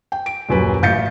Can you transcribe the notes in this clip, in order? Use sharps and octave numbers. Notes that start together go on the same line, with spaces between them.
G5
D7
D#1 F#2 B4
A1 F5 G6 A6 C#7